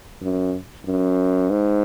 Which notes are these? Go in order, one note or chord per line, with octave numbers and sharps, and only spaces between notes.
F#2
F#2
G#2